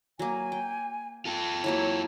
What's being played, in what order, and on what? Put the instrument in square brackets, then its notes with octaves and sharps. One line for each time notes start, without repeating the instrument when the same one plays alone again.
[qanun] F#3 A#3 [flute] G#5
[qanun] G5
[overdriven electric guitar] F4 A4
[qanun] F#3 A#3 E4 [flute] C#5